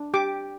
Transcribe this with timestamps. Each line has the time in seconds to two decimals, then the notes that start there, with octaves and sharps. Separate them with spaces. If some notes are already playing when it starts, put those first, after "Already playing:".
Already playing: D4
0.14 G4 D6